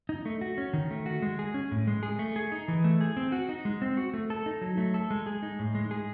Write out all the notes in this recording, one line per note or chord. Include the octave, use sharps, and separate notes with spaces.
D#4
A3
F#4
C#4
D#3
A3
F#4
G#3
G#4
C#4
A2
G#3
G#4
A3
G#4
D#4
E3
A3
G#4
C4
F#4
D#4
G#3
C4
F#4
A3
A4
D#4
F#3
A3
A4
G#3
G#4
D#4
A2
G#3
G#4